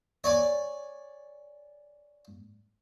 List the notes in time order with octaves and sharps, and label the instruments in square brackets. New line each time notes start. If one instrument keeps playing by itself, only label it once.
[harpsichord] C#5 D5 G#5